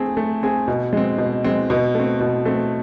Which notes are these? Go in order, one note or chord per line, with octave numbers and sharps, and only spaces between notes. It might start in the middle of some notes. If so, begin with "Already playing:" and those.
Already playing: A3 C4 G#4
A3
C4 G#4
B2
G#3 C4
B2
G#3 C4
B2
A3 C4
B2
A3 C4